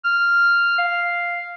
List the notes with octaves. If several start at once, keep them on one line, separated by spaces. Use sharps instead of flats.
F6
F5